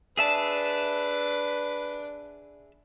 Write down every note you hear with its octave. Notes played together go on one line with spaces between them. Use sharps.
D4 G#4 B4 E5 A5